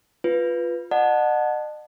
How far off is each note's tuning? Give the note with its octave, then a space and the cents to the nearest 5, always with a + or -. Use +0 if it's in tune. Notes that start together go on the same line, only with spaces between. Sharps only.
F4 +0 B4 +0
D#5 -45 F#5 -15 A5 +0